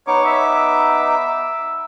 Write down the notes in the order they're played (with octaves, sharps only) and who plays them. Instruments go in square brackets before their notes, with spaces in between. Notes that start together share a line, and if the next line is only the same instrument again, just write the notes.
[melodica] B3 D#4 D6 [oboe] C#5
[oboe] E5